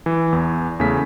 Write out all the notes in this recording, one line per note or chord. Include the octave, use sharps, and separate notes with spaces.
E3
E2
E2 C#3 A3 B6